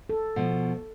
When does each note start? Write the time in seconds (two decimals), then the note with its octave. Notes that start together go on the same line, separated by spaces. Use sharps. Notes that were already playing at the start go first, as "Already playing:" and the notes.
0.09 A4
0.36 B2 F3